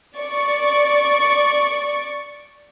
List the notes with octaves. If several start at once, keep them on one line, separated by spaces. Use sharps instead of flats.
D5 C#6